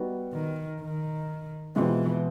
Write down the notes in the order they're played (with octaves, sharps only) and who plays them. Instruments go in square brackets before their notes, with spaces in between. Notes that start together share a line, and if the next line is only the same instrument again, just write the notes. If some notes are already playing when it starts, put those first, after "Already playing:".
Already playing: [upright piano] G3 B3 D#4 F#4
[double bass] D#3
D#3
[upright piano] B2 G#3 C4 F4 [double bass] E3